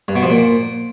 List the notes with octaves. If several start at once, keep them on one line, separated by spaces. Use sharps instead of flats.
G2
B2
F3
A#2